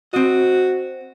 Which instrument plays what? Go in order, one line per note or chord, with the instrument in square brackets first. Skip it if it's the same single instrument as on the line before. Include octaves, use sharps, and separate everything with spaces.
[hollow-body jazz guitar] C4 D#5 [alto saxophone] F#4